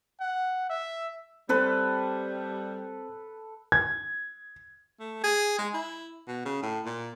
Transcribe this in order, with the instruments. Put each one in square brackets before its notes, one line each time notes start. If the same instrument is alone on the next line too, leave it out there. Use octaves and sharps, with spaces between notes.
[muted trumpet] F#5
E5
[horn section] G3 [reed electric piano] C4 C5 [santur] A4 B4
[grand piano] G#6
[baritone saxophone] A3
G#4
G#3
E4
B2
C#3
A2
A#2